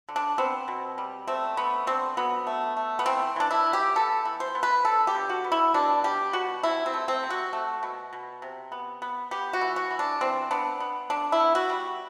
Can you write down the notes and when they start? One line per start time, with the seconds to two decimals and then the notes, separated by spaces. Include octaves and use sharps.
0.09 D3
0.16 D4
0.38 B3 C4
0.68 B2
0.98 G3
1.27 A3 C4
1.57 D3 B3
1.87 D3 C4
2.17 F#3 B3
2.47 A3
2.77 A3
2.99 B3
3.06 E3 C4
3.36 E3 D4
3.51 E4
3.66 E3
3.73 G4
3.96 B3 A4
4.25 E3
4.40 C5
4.55 B3
4.63 B4
4.85 D3 A4
5.07 G4
5.15 D3
5.29 F#4
5.44 B3
5.52 E4
5.74 B2 D4
6.04 G3 G4
6.33 B2 F#4
6.63 C3 E4
6.86 C4
6.94 A3
7.08 C4
7.23 C3
7.30 F#4
7.53 A3
7.83 B2
8.13 B2
8.42 C3
8.72 B3
9.02 B3
9.31 B3 G4
9.53 F#4
9.61 E3
9.76 F#4
9.91 E3
9.99 D4
10.21 E3 C4
10.51 B3 D4
10.80 B3
11.10 D3 D4
11.32 E4
11.40 B3
11.55 F#4
11.70 G3